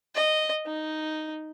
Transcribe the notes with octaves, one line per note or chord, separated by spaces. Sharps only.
D#5
D#4